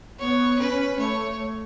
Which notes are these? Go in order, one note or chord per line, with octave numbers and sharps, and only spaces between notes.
B3 C#5
C#4 B4
A3 C#5